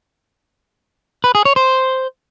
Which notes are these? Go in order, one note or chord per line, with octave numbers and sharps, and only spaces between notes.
B4
G#4
C#5
C5